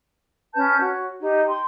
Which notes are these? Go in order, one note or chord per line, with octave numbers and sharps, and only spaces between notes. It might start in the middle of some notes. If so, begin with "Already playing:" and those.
C#4 B4 A5 G6
F#4 C#5
D#4 G4
G5 C6